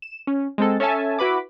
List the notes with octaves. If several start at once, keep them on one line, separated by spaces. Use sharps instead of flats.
E7
C#4
G#3 C4 A4
C#4 A4 C#5 E5 G#5 A5
E4 F#4 B4 B5 D6